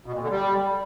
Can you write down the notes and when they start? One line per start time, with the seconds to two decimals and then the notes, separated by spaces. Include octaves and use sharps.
0.06 B2
0.14 A#2
0.22 D3
0.30 G3